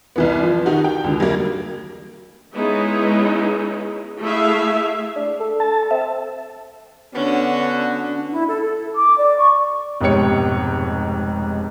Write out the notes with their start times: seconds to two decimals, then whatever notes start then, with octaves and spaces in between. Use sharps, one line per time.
0.16 C2 E3 B3
0.43 F3
0.65 D#3 D#4 F#4 G4
0.84 G5
1.04 C#2 D3
1.20 F#3 G3 A#3
2.55 G#3 B3 C#4 D#4 E4 G#4
4.21 A3 E4 G#4 E5 F5
5.16 D4
5.40 A4
5.60 A5
5.91 C4 E5
7.15 D3 B3 C#4 D4 F#4
8.32 E4
8.48 A4
8.62 A4
8.93 D6
9.17 D5
9.37 C#6
10.01 F1 G#2 B2 G4 C#5 C#7